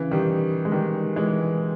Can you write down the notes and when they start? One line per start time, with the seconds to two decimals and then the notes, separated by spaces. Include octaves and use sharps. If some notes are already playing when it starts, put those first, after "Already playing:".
Already playing: C#3 E3
0.11 D#3 G3
0.65 G#3
0.71 D#3 G3
1.16 E3 G#3